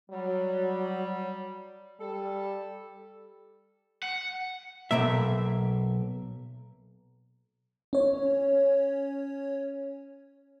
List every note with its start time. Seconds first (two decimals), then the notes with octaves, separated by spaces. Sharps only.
0.11 F#3 G3
2.00 G3 A4
4.03 F#5
4.91 B1 F2 B2 A#3 E5
7.93 C#4 C#5